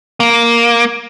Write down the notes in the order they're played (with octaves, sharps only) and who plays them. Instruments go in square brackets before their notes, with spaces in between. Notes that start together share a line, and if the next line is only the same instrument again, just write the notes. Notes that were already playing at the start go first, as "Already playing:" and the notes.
[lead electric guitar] A#3